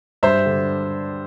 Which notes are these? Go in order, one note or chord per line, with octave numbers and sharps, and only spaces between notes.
G2 C5 E5
D3